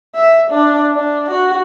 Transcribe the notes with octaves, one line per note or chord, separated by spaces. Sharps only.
E5
D4
D4
F#4